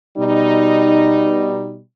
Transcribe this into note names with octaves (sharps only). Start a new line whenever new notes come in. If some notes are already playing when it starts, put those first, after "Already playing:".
B2 G3 D#4